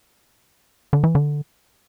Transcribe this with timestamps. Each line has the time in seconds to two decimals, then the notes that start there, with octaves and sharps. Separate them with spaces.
0.93 D3
1.04 E3
1.15 D3